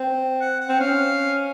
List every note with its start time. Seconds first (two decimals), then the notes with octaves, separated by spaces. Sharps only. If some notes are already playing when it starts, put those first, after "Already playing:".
Already playing: C4
0.41 F#5
0.61 F#5
0.69 C4
0.81 C#4 F5